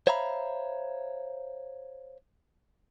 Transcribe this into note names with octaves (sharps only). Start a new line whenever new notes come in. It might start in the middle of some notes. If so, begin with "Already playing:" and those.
C5 C#5 E5 F5 A#5 B5